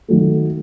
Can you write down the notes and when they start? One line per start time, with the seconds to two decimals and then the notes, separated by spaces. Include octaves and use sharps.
0.08 D#3 F#3 A3